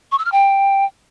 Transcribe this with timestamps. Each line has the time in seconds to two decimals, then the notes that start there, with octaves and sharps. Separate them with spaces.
0.12 C#6
0.19 E6
0.25 F6
0.32 G5